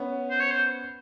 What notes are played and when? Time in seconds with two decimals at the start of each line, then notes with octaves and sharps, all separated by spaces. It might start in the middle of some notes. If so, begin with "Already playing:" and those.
Already playing: B3 C#4
0.30 C5
0.40 C#5
0.51 C5